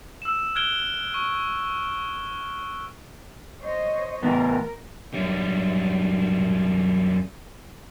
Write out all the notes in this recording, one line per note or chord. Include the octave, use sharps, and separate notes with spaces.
E6 E7
F6 F#6 G#6 D7 G7
C#6
C5 C#5 D#5
A2 E3 B3 A#4
F#2 G3